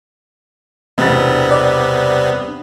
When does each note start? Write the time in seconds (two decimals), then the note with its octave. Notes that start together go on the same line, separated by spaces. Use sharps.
0.98 E1 G2 C3 B3 D4 A6
1.51 D5